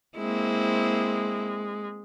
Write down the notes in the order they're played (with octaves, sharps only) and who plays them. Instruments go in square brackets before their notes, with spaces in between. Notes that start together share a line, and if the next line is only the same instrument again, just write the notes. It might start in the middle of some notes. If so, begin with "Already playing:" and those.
[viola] G#3 [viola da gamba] A#3 C4 E4